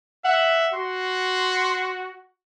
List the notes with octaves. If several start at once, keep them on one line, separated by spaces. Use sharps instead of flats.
E5 F#5
F#4 C6